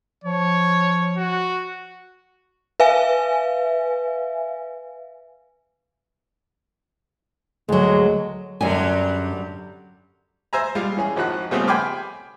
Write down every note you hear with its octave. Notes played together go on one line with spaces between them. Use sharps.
F3 C#5
F#4
B4 E5 F5 G#5
D2 F#3 G#3
F#2 D3 F#3 G3 G4 G#5
C5 E5 G#5 A#5
G3 G#3 F4
E3 C#4 G#4
G#1 F3 F#4 F#6
C#3 F3 G3 A3 B3 C4
G5 G#5 B5 C6 D6 F6